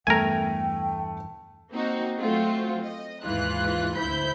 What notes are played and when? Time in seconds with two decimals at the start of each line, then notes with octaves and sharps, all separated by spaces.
0.07 E2 G2 A3 B3 A#4 G5 G#5
1.70 A#3 C4 D#4 F#4
2.21 F#3 A3 C4 F4 F#4
2.82 D#5
3.23 D#2 G#2 E3 F4 F#6
3.95 D2 E4 C5 B5 G6